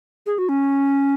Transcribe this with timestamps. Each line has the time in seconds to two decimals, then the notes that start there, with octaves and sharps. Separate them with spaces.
0.26 G#4
0.38 F#4
0.49 C#4